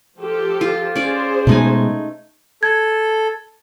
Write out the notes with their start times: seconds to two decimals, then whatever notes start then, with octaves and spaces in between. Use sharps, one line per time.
0.20 F3 G4 A4
0.61 F4
0.96 C#4 G#4 C5 D5
1.47 B2 G#3 A3 D#4 G#5
2.63 A4 G#6